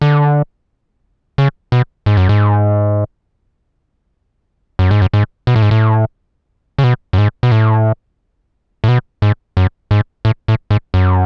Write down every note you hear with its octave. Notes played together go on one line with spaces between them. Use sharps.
D3
C#3
B2
G#2
F#2
G#2
F#2
G#2
F#2
G#2
B2
A2
G#2
A2
C#3
B2
F#2
G#2
B2
A2
A2
B2
G#2
F#2
G#2
A2
A2
G#2
F#2